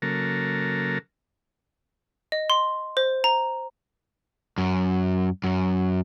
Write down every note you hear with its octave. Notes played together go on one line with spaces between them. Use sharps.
C#3 F#3 A#3 A4 A#4
D#5
C6
C5
A#5
F#2
F#2